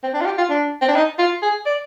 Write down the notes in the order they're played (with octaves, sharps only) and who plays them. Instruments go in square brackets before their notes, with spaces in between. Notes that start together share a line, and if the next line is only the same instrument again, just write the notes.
[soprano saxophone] C4
D4
F4
G4
F4
D4
C4
D4
D#4
F4
G#4
D5